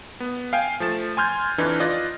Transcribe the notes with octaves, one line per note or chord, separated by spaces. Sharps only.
B3
F5 G5 G#5
F3 A3 A6 E7
G#5 C6 F6 G6 G#6
F2 E3 D4 D#4 B4
F4 B4 D5 D#5